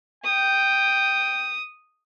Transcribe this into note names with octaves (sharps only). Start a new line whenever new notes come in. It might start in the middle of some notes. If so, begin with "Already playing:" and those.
G5 D#6